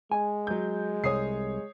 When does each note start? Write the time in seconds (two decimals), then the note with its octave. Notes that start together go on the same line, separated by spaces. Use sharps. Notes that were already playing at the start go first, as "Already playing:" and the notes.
0.12 G#3 G#5
0.47 F#3 G6
1.04 C2 C#5 D#6 C7